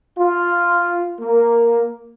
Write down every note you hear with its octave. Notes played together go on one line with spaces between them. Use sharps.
F4
A#3